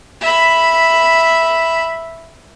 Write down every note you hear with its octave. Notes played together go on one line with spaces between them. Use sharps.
E5 B5